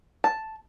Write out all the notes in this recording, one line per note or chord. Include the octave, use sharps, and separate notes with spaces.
A5